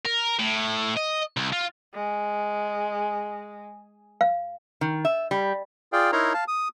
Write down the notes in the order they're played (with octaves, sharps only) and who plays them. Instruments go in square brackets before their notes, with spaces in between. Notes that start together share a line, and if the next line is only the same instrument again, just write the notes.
[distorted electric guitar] A#4
A2
D#5
C2
F4
[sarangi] G#3
[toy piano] F5
[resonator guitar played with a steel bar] D#3
E5
G3
[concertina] F4 G#4 D5 F5 G5
D#4 E4 A#4 C#5 A#5 C6
F5 A5
D#6